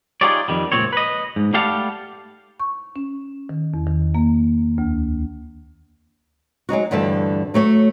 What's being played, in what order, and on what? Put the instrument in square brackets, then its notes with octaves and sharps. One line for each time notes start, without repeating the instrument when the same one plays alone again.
[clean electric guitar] D#4 F4 G4 G#4 C#5 D5
F2 D#3 G3
C#2 A#2 C4 C#5
B4 D#5
G#2
G3 A3 G4 F5 F#5 A5
[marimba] C#6
C#4
D#3
E2
D#3
A#3
D2
[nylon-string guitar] F#3 G#3 D#4 F#4
D2 G2 D3 E3 A4
F#3 A3 C#5